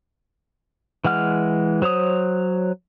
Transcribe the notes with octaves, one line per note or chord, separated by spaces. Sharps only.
E3 G#3 F#5 F6
F#3 C5 C#5 D#6